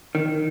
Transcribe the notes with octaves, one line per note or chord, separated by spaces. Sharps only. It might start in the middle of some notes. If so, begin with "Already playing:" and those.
D#3